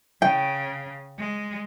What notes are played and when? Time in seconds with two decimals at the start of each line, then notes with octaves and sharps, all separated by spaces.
0.22 C#3 G5
1.18 G#3